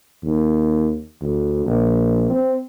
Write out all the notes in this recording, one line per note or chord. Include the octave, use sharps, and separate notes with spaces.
D#2
D2
A#1
C4